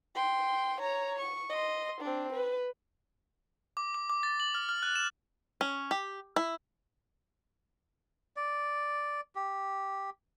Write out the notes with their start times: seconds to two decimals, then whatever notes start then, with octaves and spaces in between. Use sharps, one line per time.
0.15 G5 C6
0.80 C#5 A#5
1.19 C#6
1.50 D#5 C6
2.01 C4 D4
2.33 B4
3.77 D6
3.94 D6
4.10 D6
4.23 A6
4.40 F#7
4.55 F6
4.69 F6
4.83 F#6
4.96 E7
5.61 C#4
5.91 G4
6.36 E4
8.36 D5
9.35 G4